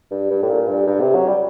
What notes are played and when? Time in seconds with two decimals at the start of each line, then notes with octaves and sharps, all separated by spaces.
0.11 G2
0.30 G2
0.42 A2
0.49 A#2
0.67 G2
0.87 G2
1.01 C3
1.15 F#3
1.28 G3